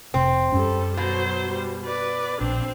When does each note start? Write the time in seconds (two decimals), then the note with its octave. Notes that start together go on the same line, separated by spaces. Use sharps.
0.14 F1 C3 C4
0.52 F#2 G3 C#4 A4
0.97 B2 F#3 C5
1.51 G3
1.85 B4 D5
2.41 A#1 C4 D4